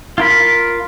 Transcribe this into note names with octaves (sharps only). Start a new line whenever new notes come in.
F4 A#4 B5